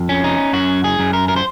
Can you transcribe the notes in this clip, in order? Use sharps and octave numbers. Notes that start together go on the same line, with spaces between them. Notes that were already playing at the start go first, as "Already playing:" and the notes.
Already playing: F2
C#4
D#4
F#2 F#4
G#4
F#2
A#4
A#4
C5